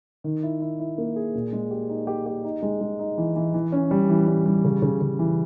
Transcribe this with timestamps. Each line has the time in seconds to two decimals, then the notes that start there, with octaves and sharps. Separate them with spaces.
0.24 D#3
0.43 E4
0.61 E4
0.79 E4
0.98 A#3
1.16 G#4
1.35 A#2
1.52 G#3
1.71 G4
1.89 D#4
2.07 G4
2.26 G4
2.44 D#4
2.62 G#3
2.81 G#3
2.99 D#4
3.18 E3
3.36 E3
3.54 E3
3.72 C#4
3.91 G3
4.09 E3
4.27 G3
4.46 G3
4.64 C#3
4.82 C#3
5.01 C#3
5.19 E3